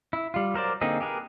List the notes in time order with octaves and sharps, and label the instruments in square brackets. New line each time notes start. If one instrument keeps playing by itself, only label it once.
[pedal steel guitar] E4
G3 F4
F#3 A#4 C5 D5
D3 A#3 C4 D#4 G#4
G4 G#4 A#4 B4